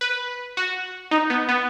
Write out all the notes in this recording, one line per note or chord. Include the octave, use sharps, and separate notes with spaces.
B4
F#4
D#4
B3
B3